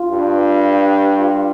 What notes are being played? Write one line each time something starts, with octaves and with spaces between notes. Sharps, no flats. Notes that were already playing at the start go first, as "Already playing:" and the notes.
Already playing: F4
G2
F4